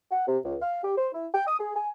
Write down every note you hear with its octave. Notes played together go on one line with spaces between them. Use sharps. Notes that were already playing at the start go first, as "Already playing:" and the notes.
F#5
C3
C#2
F5
G4
C5
E4
G5
D#6
G#4
G#5